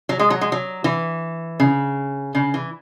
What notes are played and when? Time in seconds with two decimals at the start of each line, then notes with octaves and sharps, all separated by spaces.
0.09 F#3
0.19 G#3
0.30 F#3
0.41 G#3
0.52 F#3
0.84 E3
1.60 C#3
2.35 C#3
2.54 E3